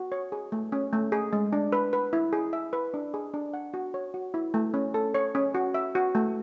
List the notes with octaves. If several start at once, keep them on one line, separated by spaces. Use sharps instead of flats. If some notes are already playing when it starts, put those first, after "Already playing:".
Already playing: F#4
C#5
G#4
A3
C#4
A3
G#4
G#3
D4
B4
B4
E4
G#4
E5
B4
D4
G#4
D4
F#5
F#4
C#5
F#4
E4
A3
C#4
A4
C#5
C#4
F#4
E5
F#4
A3